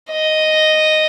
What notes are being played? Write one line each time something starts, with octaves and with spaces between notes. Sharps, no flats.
D#5